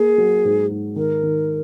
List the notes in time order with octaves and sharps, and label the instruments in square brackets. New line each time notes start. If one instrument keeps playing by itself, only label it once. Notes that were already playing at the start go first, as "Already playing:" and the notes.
Already playing: [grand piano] A#3 A#4 [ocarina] G#4
[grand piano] F#3
G#2
G#2
[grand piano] D#3 [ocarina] A#4
[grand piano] D#3